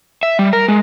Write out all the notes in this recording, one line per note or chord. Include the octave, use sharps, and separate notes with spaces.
E5
G3
A#4
G#3